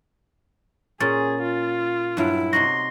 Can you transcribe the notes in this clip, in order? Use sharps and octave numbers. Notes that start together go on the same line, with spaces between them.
A#2 C#4 G#4 A6
F4
G2 F#3 E4
C3 D#4 F#4 C6 A#6